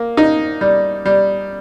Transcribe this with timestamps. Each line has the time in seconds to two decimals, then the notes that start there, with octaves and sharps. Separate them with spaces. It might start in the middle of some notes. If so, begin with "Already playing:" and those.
Already playing: A#3
0.17 D#4
0.61 G3
1.06 G3